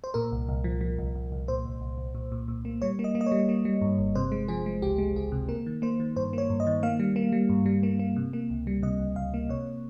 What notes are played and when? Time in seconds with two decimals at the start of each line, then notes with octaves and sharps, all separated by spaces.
0.04 C5
0.14 A#2 A#4
0.32 C2
0.49 C2
0.64 F3
0.81 F3
0.99 C2
1.15 C2
1.32 C2
1.48 A#2 C5
1.66 C2
1.81 C2
1.98 C2
2.15 A#2
2.32 A#2
2.48 A#2
2.65 A#3
2.82 G3 C#5
2.99 A#3
3.04 D#5
3.15 A#3
3.21 D#5
3.26 C#5
3.32 G3
3.49 A#3
3.65 G3
3.81 G2
3.98 G1
4.15 C3 C5
4.32 G#3
4.48 F3 G#4
4.66 G#3
4.82 C#2 G4
4.98 G#3
5.16 C#2 G#4
5.32 C3
5.48 A#3 A#4
5.66 D#3
5.82 A#3 C5
6.00 D#3
6.16 G2 C5
6.33 A#3 C#5
6.50 G2
6.60 D#5
6.67 D#3
6.83 A#3 F5
7.00 G3
7.16 A#3
7.32 G3
7.49 G2
7.66 G3
7.83 A#3
7.99 A#3
8.16 C3
8.33 A#3
8.50 C#2
8.67 G3
8.83 C3 D#5
9.00 C#2
9.16 C#2 F5
9.34 A#3
9.49 C3 C#5